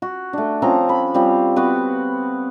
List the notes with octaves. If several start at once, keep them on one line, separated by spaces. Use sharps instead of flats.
F#4
A3 D4
F3 C4 C#4 A#5
B5
G3 C4 F4
B3 C4 F#4 B4